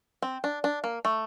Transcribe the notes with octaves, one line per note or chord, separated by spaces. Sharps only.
C4
D4
D4
A#3
A3